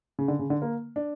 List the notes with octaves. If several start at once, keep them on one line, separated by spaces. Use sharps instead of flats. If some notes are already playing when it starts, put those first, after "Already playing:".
C#3
D3
C#3
D3
A#3
D4